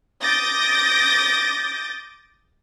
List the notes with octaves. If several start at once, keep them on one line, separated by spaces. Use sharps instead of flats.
D6 D#6 G6 A6 A#6